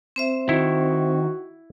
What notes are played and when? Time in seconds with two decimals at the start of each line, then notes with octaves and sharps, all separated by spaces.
0.16 C4 C5 E5
0.49 D#3 E4 F#4